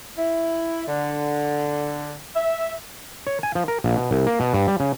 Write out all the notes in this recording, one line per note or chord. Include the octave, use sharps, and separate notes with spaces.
E4
D3
E5
C#5
G#5
F3
A#4
A#1
B2
C2
A#3
B2
G2
G3
C#3